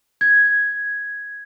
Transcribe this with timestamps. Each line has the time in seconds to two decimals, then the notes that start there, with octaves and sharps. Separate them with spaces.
0.21 G#6